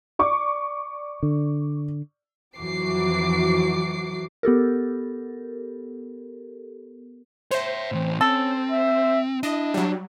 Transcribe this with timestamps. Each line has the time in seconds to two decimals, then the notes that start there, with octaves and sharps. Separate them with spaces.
0.19 D5 C#6 D6
1.23 D3
2.57 F2 E3 F#3 F#4 D6 C7
4.43 B3 G4 A4 A#4
7.51 C5 C#5 E5
7.92 A2 E3 C4
8.21 C4 C#4 A4
8.71 E5
9.43 D4 E4 D#5
9.74 F#3 G3